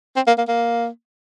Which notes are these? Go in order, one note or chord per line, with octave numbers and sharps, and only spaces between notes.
C4
A#3
A#3
A#3